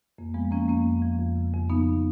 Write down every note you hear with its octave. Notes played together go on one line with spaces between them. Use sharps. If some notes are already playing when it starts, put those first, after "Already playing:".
F2 A#3
F3 G#3 B3
F3 A#3 C#4
F2 A#3 C#4
F2
F3
F2
C#3
F2
F3 B3 D#4